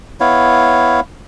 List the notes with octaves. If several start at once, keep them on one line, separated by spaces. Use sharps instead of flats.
B3 E4 C#5 F5